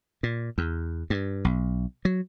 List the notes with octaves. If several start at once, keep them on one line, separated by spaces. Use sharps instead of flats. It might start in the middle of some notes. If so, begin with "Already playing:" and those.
A#2
E2
G2
B1
F#3